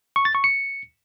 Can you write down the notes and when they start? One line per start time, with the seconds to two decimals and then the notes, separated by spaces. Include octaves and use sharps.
0.16 C#6
0.25 A6
0.35 C#6
0.44 C#7